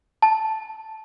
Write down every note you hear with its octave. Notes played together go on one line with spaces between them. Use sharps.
A5